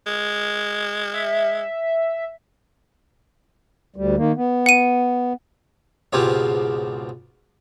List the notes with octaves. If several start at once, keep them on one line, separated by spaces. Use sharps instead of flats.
G#3
E5
D2 G3
D#3 A#3
B3
F#5 D#7
C#2 G#2 B2 C4 F4 G4